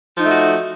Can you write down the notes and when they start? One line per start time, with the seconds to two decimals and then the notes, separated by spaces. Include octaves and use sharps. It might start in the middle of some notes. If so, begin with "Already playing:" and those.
0.14 F3
0.19 D#4
0.24 A3
0.29 F#4